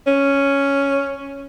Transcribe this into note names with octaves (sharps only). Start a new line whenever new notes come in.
C#4